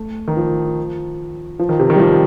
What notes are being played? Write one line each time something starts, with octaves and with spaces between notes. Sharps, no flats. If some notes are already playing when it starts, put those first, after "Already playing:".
Already playing: A3
D#3
F3
F3
D#3
C3
D#3
G3
F3